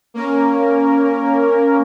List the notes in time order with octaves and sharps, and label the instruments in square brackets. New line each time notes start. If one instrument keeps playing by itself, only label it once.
[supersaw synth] A#3 C#4 A#4